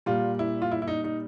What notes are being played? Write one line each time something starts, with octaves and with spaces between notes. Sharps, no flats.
A#2 G3 F4
E4
F4
E4
E4
D#4
D#4